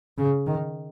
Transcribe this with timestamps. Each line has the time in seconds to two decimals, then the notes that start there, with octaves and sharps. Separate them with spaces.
0.18 C#3
0.47 D#3